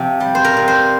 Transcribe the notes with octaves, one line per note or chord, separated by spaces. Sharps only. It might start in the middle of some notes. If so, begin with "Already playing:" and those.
Already playing: C3 F3
G3
C5
A#4
C3
C5